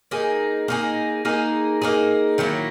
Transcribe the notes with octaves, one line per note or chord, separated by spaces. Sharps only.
A#3 D#4 G#4
A#3 D#4 G#4
A#3 D#4 G#4
A#3 D#4 G#4
D#3 F#3 A#3 E4